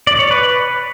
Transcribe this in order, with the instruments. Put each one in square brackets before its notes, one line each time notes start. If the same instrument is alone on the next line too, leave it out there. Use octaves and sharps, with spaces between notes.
[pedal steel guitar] D5
C#5
B4